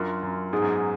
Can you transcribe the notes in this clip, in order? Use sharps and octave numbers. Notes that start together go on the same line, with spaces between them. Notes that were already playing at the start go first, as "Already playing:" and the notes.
Already playing: F#2 D4 F4 A#4
F#2
G#2 B3 D#4 G#4
F#2